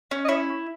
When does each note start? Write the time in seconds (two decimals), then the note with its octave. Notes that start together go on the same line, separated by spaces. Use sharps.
0.11 C#4
0.25 D#5
0.29 E4 C#5